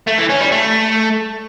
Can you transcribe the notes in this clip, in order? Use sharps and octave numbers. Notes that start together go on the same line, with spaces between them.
A3
E3
C#4
G3
A3